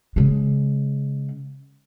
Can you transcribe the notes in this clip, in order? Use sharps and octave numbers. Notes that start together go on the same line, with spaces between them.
C#3 G#3